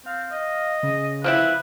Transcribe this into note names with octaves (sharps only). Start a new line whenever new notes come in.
C4 F5
D#5
C#3
F3 C4 E4 B4